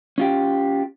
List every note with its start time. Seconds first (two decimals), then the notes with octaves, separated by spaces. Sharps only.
0.18 C#4 F4 G4